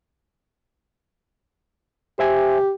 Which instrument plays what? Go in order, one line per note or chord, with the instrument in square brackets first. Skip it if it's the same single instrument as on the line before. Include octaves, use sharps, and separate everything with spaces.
[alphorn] G4 [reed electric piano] C5 E5 G#5